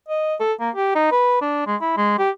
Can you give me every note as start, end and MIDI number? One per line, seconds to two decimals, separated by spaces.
0.08 0.35 75
0.40 0.53 69
0.60 0.70 58
0.76 0.93 67
0.95 1.09 63
1.11 1.41 71
1.41 1.65 62
1.67 1.76 56
1.81 1.93 64
1.97 2.15 56
2.18 2.30 67